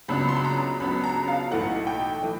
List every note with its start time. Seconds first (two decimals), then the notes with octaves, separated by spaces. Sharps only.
0.08 C#2 C#3 F#3 B3 D4 B5
0.29 C6
0.36 B5
0.44 A#5
0.80 C#2 C#3 F#3 B3 D4 B5
1.04 A#5
1.28 F5
1.51 B1 A2 E3 A3 F#5
1.87 G5
2.23 E3 A3